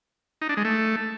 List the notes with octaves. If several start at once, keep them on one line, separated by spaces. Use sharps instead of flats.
D#4
D4
G#3
A3